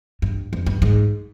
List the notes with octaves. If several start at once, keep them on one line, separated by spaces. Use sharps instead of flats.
G2
F2
G2
G#2